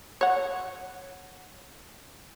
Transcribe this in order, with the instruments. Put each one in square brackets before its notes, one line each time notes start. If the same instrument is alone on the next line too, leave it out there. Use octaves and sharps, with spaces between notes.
[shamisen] C#5 F#5